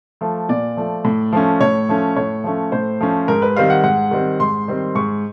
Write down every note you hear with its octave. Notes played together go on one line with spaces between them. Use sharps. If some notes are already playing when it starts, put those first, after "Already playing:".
F3 A3
A#2 D5
F3 A3
A2
F3 A3 C#4
A2 C#5
F3 A3 C#4
A2 C#5
F3 A3 C#4
A2 C5
F3 A3 C#4
G#2 A#4
B4
D#3 G3 C4 F5
F#5
G#2 F#5
D#3 G3 C4
G#2 C6
D#3 G3 C4
G#2 C#6